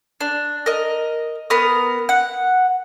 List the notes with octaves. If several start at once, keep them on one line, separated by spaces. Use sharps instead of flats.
D4
A#4 D#5
B3 A#4 D#6
F#5